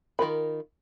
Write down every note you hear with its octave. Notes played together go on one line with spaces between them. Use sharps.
D#3 G#3 F4 A#4 B5